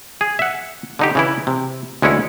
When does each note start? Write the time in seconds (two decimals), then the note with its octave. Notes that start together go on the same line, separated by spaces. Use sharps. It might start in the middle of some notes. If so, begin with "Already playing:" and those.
0.21 G#4
0.39 E5 F#5
0.99 D3 D#4 G4
1.15 C#3 E3 E4
1.47 C3
2.02 D2 G#3 C#4 E4 C#5